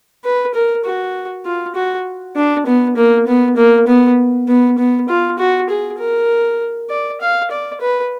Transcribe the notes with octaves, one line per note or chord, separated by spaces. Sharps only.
B4
A#4
F#4
F4
F#4
D4
B3
A#3
B3
A#3
B3
B3
B3
F4
F#4
G#4
A#4
D5
F5
D5
B4